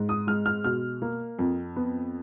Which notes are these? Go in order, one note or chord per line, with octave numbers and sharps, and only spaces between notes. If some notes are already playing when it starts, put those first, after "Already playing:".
Already playing: G#2
D#6
G#3 F6
F6
B2 F6
A#3
F2
B3